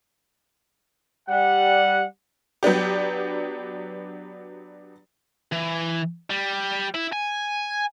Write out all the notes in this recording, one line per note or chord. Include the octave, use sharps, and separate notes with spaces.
G3 F#5
F#3 B3 D4 G4
E3
G3
E4
G#5